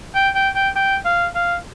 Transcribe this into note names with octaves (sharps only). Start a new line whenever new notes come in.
G5
G5
G5
G5
F5
F5